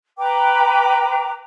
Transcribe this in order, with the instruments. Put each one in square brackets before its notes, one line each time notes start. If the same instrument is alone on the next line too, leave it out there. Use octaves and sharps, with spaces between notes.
[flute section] B4 G5 A#5 D6